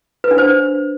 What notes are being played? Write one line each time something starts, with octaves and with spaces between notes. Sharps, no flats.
B4
D4
C5